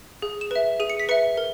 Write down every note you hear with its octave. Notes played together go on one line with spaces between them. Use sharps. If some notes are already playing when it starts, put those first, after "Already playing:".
G#4
E7
B4 E5
G#4 D#7
C#7
B6
B4 E5 C#7
A#4